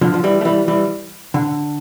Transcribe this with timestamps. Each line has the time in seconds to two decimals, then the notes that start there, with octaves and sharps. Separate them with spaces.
0.01 D3 F3
0.14 F3
0.24 E3 G3
0.41 A3
0.45 E3 G3
0.68 E3 G3
1.34 D3